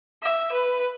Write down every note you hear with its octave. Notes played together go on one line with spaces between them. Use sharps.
E5
B4